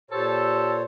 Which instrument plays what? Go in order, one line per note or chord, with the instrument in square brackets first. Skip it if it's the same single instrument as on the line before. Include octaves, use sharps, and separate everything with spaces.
[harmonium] A#2 C5 C#5 [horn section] G4 A4